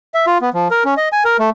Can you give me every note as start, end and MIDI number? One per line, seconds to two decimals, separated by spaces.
0.14 0.26 76
0.27 0.38 65
0.41 0.50 59
0.54 0.68 53
0.71 0.83 70
0.85 0.94 61
0.97 1.09 75
1.12 1.24 80
1.25 1.37 70
1.39 1.50 57